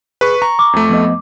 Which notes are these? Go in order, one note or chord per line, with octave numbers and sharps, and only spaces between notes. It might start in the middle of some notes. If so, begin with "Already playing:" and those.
G#4 B4 C#6
A#5 C#6
D6
F2 A3
F3 B3 D#5